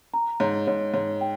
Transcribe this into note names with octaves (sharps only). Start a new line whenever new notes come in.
A#5
G#2 C#5
G#2 C#5
G#2 C#5
G5